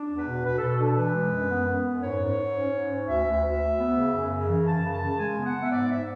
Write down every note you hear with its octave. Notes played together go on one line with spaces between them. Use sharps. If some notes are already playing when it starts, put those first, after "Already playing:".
Already playing: D4
E2
B4
B2
B2 B4
A4
B2
A4
D4
E3 B4
G#3
F#2
B3
B3
F#2
G#2 C#5
G#2
G#2
C#4
G#2
C#4
D2 E5
D2
D2
D2
B3
C#3
F#2
C#3
E3
F#2 A5
C#3
A5
C#3
G#3 G#5
B3
F#5
B3
E5
G#2 D5
G#2 E5